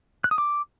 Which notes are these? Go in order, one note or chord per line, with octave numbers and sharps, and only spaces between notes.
F#6
D#6
D6